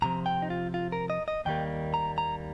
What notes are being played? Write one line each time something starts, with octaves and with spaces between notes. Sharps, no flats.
C2 C3 F3 A#5
G5
D#4
F4
F4
A#4
D#5
D#5
D#2 D#3 G3 A#3 G5
A#5
A#5